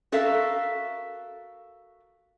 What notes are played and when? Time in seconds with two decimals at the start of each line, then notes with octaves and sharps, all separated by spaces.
0.12 F#4 A4 A#4 E5 F5